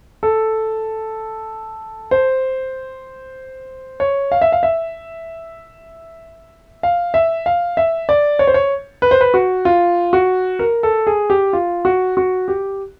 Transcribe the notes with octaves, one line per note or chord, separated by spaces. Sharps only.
A4
C5
C#5
F5
E5
F5
E5
F5
E5
F5
E5
D5
C#5
C5
C#5
B4
C5
B4
F#4
F4
F#4
A#4
A4
G#4
G4
F4
F#4
F#4
G4